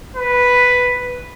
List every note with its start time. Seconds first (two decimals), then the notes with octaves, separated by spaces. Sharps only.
0.16 B4